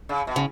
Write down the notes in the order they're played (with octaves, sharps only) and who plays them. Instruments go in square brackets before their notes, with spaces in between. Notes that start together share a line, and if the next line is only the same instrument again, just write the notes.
[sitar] C#3
B2
[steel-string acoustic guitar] C#3